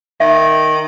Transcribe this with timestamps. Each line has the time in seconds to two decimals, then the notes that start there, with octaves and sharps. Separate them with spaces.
0.20 D#3 E5